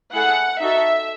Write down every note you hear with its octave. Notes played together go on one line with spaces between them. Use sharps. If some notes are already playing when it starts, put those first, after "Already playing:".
A3 E4 G#4 F#5
D#4 F#4 A4 E5